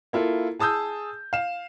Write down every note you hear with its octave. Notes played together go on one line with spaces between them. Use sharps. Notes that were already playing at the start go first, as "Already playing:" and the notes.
A#3 E4 F4 A4
G#4 A5 D#6 E6 G6
F5 E7